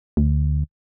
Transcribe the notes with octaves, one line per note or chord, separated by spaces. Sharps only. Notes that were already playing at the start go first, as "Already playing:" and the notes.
D2